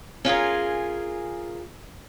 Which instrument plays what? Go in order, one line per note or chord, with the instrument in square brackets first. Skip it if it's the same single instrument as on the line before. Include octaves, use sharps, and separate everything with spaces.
[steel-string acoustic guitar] C#4 F4 G#4 A#4